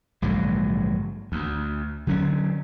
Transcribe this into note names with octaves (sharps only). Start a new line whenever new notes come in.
A#1 G#2 D3 F#3
D2
D3 F#3 C#4